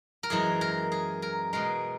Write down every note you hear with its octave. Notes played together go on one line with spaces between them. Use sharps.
A#4
F#2 E3 G#3 G#4
A#4
G#4
A#4
B2 G#3 A#4